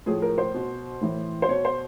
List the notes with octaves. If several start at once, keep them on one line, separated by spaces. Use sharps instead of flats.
A2 F3 G#4
A#4
C5
B2
A2 E3
C5
B2 C#5
C5